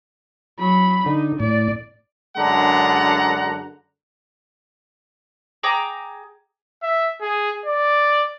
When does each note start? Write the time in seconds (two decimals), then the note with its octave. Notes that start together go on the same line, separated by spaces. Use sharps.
0.59 F#3 B5
1.06 D3 D#4
1.40 A2 D5
2.37 F#2 D3 G#3 D4 F#5 A#5
5.63 G#4 G5 A#5 D6
6.83 E5
7.22 G#4
7.65 D5